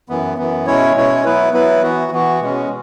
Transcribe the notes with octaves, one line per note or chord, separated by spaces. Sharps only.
F#2 E3 B3
F#2 E3 B3
B2 G#3 C#4 E4 C#5
B2 G#3 C#4 E4 C#5
F#3 B3 E4 B4
F#3 B3 E4 B4
E3 B3 F#4
E3 B3 F#4
B2 G#3 C#4